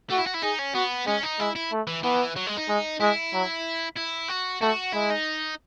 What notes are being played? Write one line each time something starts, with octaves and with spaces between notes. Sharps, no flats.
A3 F#4
E4
F#4
E4
D#4 G#4
C#4
B3 F#4
G#3 C#4
D#4
G#3 E4
E4
A3
E3
E3 B3
F#3
G#3
D#4
G#3
G#3 E4
F#3
E4
F#4
A3 F#4
G#3 E4
D#4